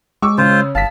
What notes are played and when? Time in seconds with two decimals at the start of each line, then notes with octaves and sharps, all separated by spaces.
0.22 G#3 C#6 D6 E6
0.38 C#3 C#4 F4 C5
0.75 G1 F5 A5 B6